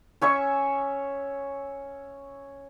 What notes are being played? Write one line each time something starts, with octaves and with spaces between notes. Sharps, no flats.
C#4 C#5 E5 C#6